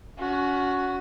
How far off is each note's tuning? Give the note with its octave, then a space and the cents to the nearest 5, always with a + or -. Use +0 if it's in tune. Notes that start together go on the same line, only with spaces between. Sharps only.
C#4 +30 F#4 +0